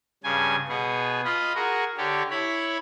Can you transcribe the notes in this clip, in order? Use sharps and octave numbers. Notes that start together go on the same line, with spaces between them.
G2 C#3 G#5
B2 B3 G#4
F4 D#5 B5
F#4 G#4 A#4
D3 G4 C#5 D5
E4 C#5 B5